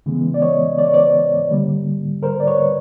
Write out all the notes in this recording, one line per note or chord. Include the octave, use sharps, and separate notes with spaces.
C#3 E3 G#3 B3
D5
C#5 D#5
D5
C#5
C5 D5
D3 G3 A#3
A#4 C5
D5
B4 C#5